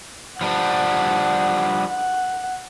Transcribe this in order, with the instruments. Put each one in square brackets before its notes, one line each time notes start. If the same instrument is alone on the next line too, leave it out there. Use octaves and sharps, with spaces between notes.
[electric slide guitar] F3 G3 D4 [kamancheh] F#5
[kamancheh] F#5